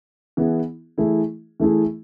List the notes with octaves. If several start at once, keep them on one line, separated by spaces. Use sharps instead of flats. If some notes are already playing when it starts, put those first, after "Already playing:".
E3 B3 E4 G#4
E3 A3 E4 G#4
E3 A3 E4 G#4